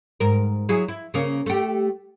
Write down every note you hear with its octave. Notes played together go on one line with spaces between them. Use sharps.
G#2 A#4
F#3 E4 G#4
E4
C#3 A#3 C#4
A3 G4